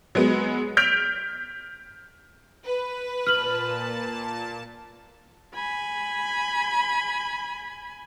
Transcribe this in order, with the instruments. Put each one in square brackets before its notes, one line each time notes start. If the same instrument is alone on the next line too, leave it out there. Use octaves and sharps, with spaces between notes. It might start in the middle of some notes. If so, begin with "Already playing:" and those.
[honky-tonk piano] F#3 G#3 B3
F6 G6 B6 D7 F7
[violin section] B4
[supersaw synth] A#2 A5 [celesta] F6 F#7
[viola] G#5 B5